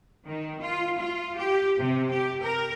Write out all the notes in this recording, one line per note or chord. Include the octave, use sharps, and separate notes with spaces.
D#3
F4
F4
G4
C3
G4
A#4